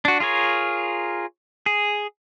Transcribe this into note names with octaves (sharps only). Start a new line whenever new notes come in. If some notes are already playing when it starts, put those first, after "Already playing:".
D4 F#4
F4 G#4 A#4 C#5
G#4